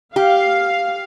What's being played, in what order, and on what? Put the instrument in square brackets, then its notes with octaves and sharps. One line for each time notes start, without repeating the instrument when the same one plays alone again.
[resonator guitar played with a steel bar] G4 [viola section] F5